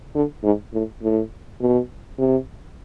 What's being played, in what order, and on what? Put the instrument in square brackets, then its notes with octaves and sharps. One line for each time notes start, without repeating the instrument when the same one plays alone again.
[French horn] D3
G#2
A2
A2
B2
C3